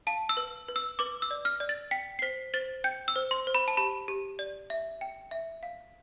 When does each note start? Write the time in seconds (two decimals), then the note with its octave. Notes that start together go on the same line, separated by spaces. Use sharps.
0.07 F5 A5
0.29 E6
0.37 B4
0.69 B4
0.76 E6
0.99 B4 D6
1.22 E6
1.31 D5
1.45 F6
1.60 D5
1.69 A6
1.91 G5 B6
2.19 C7
2.22 C5 B6
2.54 C5 A6
2.84 G5 G6
3.08 E6
3.16 C5
3.31 C6
3.47 C5
3.55 B5
3.68 A5
3.77 G4 B5
4.08 G4
4.39 D5
4.70 E5
5.01 G5
5.31 E5
5.63 F5